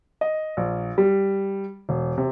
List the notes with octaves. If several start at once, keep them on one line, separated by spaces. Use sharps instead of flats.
D#5
A#1
G3
E1
C3